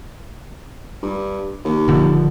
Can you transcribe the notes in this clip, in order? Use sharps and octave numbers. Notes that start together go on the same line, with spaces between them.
G2
D#2
D#1 D3 F3